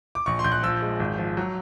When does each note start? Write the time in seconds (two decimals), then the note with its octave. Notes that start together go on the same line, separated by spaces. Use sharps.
0.15 D6
0.26 A#1 C#6
0.39 C6
0.44 A#1 G6
0.52 F#6
0.63 F3 E6
0.82 G#3
1.00 G#1
1.18 F3
1.37 F#3